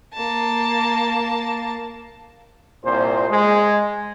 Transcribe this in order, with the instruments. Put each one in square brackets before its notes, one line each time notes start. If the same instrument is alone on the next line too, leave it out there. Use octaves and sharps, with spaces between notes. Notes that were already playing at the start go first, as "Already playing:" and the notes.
[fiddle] A#3 A5
[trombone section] C2 A#2 C5
G#3